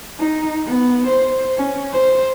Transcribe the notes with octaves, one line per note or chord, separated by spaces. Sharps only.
D#4
B3
C5
C#4
C5